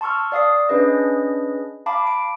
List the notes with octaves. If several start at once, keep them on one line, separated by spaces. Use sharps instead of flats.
A5 C6 C#6 E6 F6
D5 F5 D#6 C7
C#4 D4 G#4 B4 D#5
F5 A5 B5 D6
D7